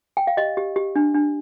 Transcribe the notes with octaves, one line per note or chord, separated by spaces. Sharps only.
G5
F5
G4 D#5
G4
G4
D4
D4